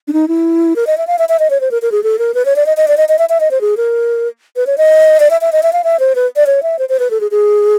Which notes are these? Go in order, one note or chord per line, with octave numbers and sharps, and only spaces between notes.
D4
D#4
E4
A#4
D#5
E5
F5
E5
E5
D#5
C#5
C5
A#4
A#4
G#4
A4
A#4
B4
C#5
D5
D#5
D#5
D5
D#5
D#5
E5
E5
D#5
C5
G#4
A#4
B4
C#5
D#5
D5
E5
E5
D#5
E5
F5
E5
C5
B4
D5
C#5
E5
C5
C5
B4
A4
G#4
G#4